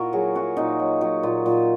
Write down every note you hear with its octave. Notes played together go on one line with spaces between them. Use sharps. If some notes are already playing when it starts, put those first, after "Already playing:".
Already playing: A#2 E4 F#4 A#4
F#3 G#4
F#3 F#4
A#2 D#4
F#3
F#3
A#2
A#2